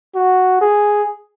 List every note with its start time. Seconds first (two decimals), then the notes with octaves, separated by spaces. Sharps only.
0.15 F#4
0.61 G#4